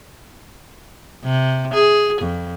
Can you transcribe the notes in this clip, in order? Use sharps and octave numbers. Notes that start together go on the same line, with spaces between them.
C3
G#4
F2